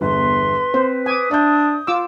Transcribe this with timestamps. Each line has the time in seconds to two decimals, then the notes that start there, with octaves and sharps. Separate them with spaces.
0.01 G1 E2 B4 C6
0.74 C4 C5
1.06 G#5 D6 D#6
1.31 D4 D5 E5 G6
1.87 F4 D6 E6